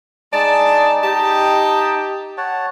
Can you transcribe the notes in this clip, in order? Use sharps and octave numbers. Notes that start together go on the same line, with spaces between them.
G#3 D#4 D5 A5
D#4 G4 D#5 A5
C#5 F#5 A5